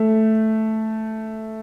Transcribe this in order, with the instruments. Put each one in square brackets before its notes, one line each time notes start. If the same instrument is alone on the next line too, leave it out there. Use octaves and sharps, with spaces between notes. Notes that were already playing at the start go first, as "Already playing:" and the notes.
Already playing: [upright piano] A3